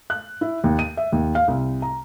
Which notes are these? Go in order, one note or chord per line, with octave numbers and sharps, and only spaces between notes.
F#6
E4
D#2
D#7
E5
D#2
F5
C2
A#5